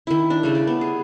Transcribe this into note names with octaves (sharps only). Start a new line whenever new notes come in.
D#3 E4
D4
C#3 G3 A3
D5
B3
G#4